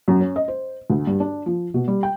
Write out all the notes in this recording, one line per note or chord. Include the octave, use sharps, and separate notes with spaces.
F#2
C#4
D#5
C5
D2
G2
D4
F3
B2
G3
G5